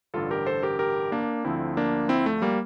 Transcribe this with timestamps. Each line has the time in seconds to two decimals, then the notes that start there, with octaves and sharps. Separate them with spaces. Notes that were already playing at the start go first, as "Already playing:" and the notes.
0.14 A1 G2 D3 F4 A4
0.31 G4 A#4
0.46 A4 C5
0.63 G4 A#4
0.79 G4 A#4
1.12 A#3 D4
1.44 D2 D3 F3 C4 E4
1.77 A#3 D4
2.09 C4 E4
2.26 A3
2.42 G3 A#3